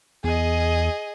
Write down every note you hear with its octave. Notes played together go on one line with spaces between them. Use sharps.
E2 G#4 D#5